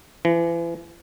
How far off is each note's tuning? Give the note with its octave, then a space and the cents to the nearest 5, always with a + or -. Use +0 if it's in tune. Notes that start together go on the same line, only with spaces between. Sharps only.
E3 +35